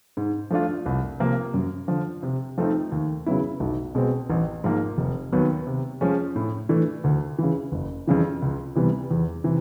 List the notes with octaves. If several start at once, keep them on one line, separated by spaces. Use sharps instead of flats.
G#2
F3 A3 D4 F4
C2
C3 F3 A#3
F#2
D3 F3
C3
F3 A3 C4 D#4
D#2
C#3 F#3 B3 E4
B1
B2 G#3 C4
A1
G#2 F3 A#3
F1
D#2 D#3 F#3 B3
C3
F3 G#3 C#4
A2
E3 A3 D4
D2
C#3 E3
F#1
F2 C#3 E3
C#2
C3 E3 G3 B3
E2
C3 E3